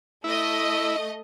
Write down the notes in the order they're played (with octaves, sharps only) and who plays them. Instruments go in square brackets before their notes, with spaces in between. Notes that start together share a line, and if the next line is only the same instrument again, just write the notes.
[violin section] A3 D#5 [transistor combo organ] E4